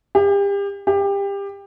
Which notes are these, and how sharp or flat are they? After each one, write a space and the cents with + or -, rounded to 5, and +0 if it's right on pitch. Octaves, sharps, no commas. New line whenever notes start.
G4 +35
G4 +25